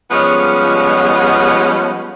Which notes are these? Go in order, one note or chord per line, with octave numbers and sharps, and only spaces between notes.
F3 G3 G#3 B3 C#4